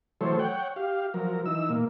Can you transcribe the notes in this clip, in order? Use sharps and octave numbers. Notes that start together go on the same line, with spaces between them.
E3 F#3 A3 A4 C5 C#5
C#5 F#5 G5
G4 F5
F3 F#3 A#4
E3 D#4 E6
A#2 A#3